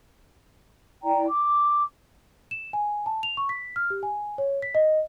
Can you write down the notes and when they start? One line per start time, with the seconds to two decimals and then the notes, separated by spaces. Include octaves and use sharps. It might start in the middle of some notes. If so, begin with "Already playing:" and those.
1.03 E4 D5 G5 A#5
1.28 D6
2.51 E7
2.73 G#5
3.06 A5
3.23 F7
3.37 C#6
3.49 B6
3.76 F6
3.90 G4
4.03 G#5
4.38 C#5
4.62 B6
4.75 D#5